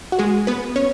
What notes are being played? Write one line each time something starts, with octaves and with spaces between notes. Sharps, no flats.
F#4
G#3 G#4
B3 B4
C#4 C#5